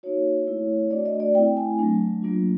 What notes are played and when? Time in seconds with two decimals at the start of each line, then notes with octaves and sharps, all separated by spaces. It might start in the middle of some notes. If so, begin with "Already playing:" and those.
0.03 A#3 D#4 F#4 C#5
0.47 A3 C4 E4
0.91 A3 D4 F#4 D5
1.05 D#5
1.20 D5
1.35 A3 C4 E4 G5
1.57 G#5
1.79 F#3 A3 D4
2.22 F#3 A#3 D4 F4